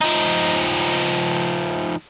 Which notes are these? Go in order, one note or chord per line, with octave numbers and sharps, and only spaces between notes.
F3 D#4